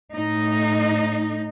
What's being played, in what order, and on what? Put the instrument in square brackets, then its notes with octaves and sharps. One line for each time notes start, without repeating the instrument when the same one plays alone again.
[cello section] A2 D#4